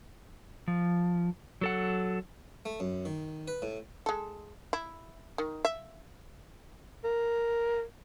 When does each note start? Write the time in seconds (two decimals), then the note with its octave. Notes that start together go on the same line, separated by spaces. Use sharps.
0.68 F3
1.61 F#3 A4 F#5
2.65 A3
2.80 F#2
3.05 D#3
3.48 B4
3.62 A2
4.06 G#3 A4
4.73 E4
5.38 D#3
5.65 E5
7.04 A#4